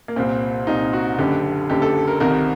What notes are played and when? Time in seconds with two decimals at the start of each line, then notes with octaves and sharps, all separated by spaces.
0.08 A#3
0.16 C2 A#2 C4
0.67 C2 A#2 D#4
0.93 F#4
1.18 F#1 F#2 D3 G4
1.70 F#1 F#2 D3 G4
1.82 A4
2.08 A#4
2.20 C2 C3 D#3 A#4